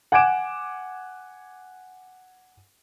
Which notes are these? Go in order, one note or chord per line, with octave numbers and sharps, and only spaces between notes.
F#5 G#5 D6 G#6 D7 E7